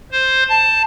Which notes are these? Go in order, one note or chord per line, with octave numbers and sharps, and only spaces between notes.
C5
A5